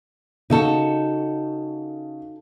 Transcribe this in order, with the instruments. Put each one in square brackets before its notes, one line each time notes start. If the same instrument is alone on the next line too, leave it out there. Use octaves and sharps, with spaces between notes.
[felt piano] C#3 [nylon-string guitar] D#4 F#4 A4